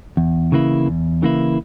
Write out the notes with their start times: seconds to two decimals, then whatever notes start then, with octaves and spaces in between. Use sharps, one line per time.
0.17 E2
0.52 C#3 E3 A#3 E4
0.86 E2
1.22 C#3 E3 A#3 E4